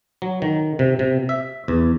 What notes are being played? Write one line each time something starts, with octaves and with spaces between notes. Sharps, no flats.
F#3
D#3
C3
C3
E5
E2